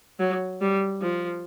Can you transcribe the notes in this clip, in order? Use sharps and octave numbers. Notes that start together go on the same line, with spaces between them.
F#3
G3
F3